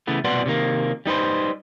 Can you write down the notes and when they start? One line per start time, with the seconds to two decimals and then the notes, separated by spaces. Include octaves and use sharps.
0.07 C#3 E3 A3 B3
0.24 C2 B2 B4 D5 F#5 C6
0.46 C3 D#3 A#3
1.06 G3 D#4 B4 C5